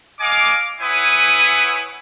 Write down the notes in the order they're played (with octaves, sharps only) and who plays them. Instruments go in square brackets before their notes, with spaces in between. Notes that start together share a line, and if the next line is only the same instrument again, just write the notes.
[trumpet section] D#5 F5 G#5 D6
E4 B4 C#5 F#5 G#5 D#6